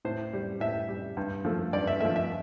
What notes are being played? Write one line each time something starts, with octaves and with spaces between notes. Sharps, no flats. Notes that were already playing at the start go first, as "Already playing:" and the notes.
A2 C5
G3
A2 E5
G3
G2
F3 A3
G2 D5
E5
F3 A3 E5
E5